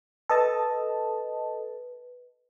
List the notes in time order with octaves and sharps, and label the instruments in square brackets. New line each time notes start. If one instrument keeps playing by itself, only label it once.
[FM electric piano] A4 D#5 A5 [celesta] B4